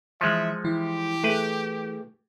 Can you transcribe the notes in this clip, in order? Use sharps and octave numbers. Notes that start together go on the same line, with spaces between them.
E3 F3 G#3 E5 C#7
E3 E4 G4
A3 G#4 B4